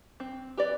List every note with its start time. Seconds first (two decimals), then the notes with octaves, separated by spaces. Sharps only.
0.20 C4
0.58 G4 B4 D5